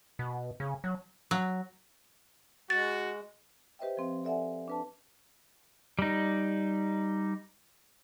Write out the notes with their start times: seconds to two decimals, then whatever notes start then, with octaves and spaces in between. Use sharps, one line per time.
0.19 B2
0.60 C#3
0.84 F#3
1.31 F#3
2.70 G#3 F#4 A6
3.79 G4 B4 C5 D#5 E5 G5
3.97 F3 C4
4.24 A4 D5 E5 F#5 G#5
4.68 D4 B4 A5
5.99 G3 D#4